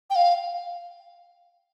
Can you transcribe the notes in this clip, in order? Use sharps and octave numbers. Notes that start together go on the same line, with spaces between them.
G5
F5